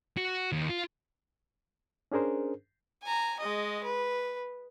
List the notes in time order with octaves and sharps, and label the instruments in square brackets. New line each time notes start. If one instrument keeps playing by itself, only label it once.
[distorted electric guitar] F#4
D#2
F4
[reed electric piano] C#4 D4 G#4 A#4 C5
[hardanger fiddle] G#5 A#5
G#3 D#5
B4